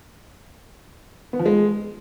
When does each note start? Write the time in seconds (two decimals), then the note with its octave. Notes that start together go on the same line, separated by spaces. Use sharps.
1.33 B3
1.39 F3
1.46 G#3